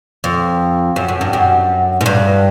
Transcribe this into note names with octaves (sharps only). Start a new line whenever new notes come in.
F2
F#2
F#2
G2
F#2
G#2
G2